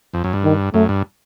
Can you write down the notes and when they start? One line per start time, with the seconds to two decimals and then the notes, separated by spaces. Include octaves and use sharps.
0.14 F2
0.24 F#2
0.33 G2
0.44 D#3
0.74 F#2 A3
0.89 G2